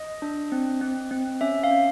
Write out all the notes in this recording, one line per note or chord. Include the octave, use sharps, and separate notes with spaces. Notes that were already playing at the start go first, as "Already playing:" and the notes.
Already playing: D#5
D4
C4
C4
C4
C#4 E5
F5
C#4